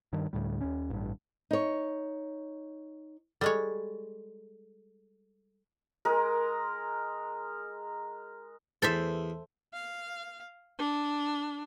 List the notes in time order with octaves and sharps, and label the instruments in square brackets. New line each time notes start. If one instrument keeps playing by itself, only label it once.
[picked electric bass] G2 D#3
D2 A2 G3
D#2 C#4
A1 G2
[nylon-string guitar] D#4 C#5
[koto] G3 G#3 C#5 [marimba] A4
[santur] G#3 A#4
[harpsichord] E2 [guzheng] A4 C5 E5
[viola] F5
D4